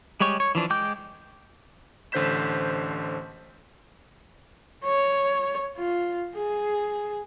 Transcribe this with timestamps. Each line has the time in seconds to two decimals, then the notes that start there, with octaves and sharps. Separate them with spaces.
0.20 G3 G#3 G4 C#5
0.40 C#5
0.55 E3 F3 D4
0.70 G#3 G5 D6 G6
2.12 A1 D3 C5 G6 B6 E7
4.84 C#5
5.78 F4
6.36 G#4